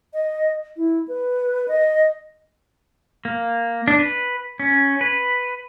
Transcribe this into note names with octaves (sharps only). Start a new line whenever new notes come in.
D#5
E4
B4
D#5
A#3
D4
B4
C#4
B4